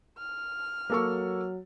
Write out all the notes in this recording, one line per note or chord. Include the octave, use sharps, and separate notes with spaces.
F6
F#3 A#3 A4 C#6